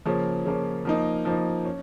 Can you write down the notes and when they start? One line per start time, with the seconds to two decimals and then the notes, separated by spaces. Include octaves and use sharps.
0.06 C#3 F3 A#3 C#4
0.45 C#3 F3 A#3 C#4
0.85 F3 A#3 D#4
1.25 F3 A#3 D#4
1.65 C#4